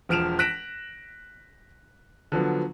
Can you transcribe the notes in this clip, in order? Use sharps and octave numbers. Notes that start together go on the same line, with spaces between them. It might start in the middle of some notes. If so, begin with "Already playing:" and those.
E1 F3 F6 D7 E7 F7
F#6 A#6 B6 D7 E7 F#7
D3 F3 F#3 B3